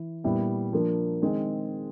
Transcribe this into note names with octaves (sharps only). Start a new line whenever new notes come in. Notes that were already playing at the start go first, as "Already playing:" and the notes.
Already playing: E3
A#2 G3 B3 E4
F3 A#3 D4
D#3 G#3 C4